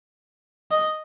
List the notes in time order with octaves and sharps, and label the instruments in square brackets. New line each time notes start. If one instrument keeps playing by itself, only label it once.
[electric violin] D#5